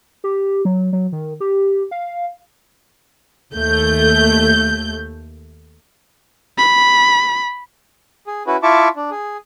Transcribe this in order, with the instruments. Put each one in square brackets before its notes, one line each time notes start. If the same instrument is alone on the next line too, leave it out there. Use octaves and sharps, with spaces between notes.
[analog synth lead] G4
F#3
F#3
D#3
G4
F5
[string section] D#2 A3 G6
[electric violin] B5
[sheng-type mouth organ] G#4
C#4 E4 F#4 B4
E4 F4 E5 A5 C#6 D6
D4
G#4